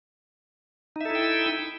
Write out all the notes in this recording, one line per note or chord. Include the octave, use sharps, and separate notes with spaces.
D#4 E4 A4 E5 G5